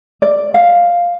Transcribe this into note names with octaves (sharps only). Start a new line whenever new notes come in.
D5
F5